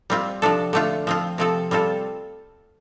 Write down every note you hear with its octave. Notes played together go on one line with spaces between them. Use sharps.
G3 C4 F4
C3 F3 D4 A4
D3 A3 F4
F3 C4 F4
C3 F3 C4 A4
G3 C4 F4 A4